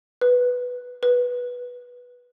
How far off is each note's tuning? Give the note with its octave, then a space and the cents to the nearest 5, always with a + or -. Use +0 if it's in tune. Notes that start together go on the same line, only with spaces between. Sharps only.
B4 +0
B4 -10